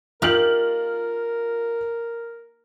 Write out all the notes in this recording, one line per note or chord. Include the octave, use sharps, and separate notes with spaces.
A#3 D#4 F4 G4 A#4 F6 F#7